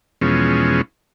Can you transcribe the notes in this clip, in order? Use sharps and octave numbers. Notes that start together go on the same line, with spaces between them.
E2 B2 F3 G#3 C#4